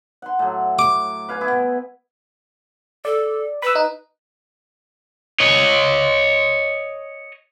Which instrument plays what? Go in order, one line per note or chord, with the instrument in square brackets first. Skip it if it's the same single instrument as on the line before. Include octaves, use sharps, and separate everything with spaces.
[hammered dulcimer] F#5 C6
A2 F#3
[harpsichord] D6
[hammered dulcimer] B4 F5 G#5
B3 E4 G#4
[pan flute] A4 [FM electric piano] D5
[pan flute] B4 [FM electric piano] B5 E6
[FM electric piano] D#4
[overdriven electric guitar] C#5 D#5